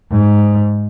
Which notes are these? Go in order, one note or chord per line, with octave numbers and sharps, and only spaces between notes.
G#2